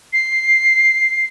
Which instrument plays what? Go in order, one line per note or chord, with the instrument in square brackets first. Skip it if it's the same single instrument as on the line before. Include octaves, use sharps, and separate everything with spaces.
[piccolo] C7